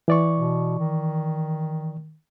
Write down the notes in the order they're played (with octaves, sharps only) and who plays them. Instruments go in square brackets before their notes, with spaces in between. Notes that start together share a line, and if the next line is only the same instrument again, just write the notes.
[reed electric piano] E3 D5 C#6
[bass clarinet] B2
D#3